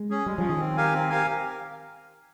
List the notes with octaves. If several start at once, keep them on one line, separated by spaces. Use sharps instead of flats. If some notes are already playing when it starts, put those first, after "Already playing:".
Already playing: G#3
C#4 G#4
G3 G#3
F3 C#4
D#3 G#4
C4
G4 A#4 F5 G#5
C4
G4 A#4 F5 G#5